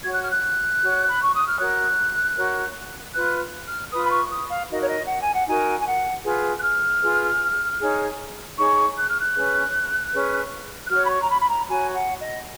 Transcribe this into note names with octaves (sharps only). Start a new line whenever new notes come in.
F#4 C#5 G#6
F#6
F6
F#6
F#4 C#5
B5
C#6
D#6
F6
F#4 A#4 C#5 F#6
F#4 A#4 C#5
F4 B4 F#6
F6
F4 B4 D#6
B5
C#6
D#6
F5
D#4 F#4 A#4 D#5
C#5
D#5
F#5
G#5
F#5
D#4 F#4 A#4 G#5
G#5
F#5
F4 G#4 B4
F#6
F6
F4 G#4 B4
D#4 G#4 C#5
D#4 G#4 C#5 C#6
F#6
F6
F#6
C#4 G#4 B4
C#4 G#4 B4
F#6
F#4 C#5 F6
B5
C#6
A#5
B5
B5
A#5
F#4 C#5 G#5
F#5
D#5